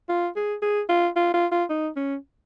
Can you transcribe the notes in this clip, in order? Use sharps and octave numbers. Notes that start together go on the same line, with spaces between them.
F4
G#4
G#4
F4
F4
F4
F4
D#4
C#4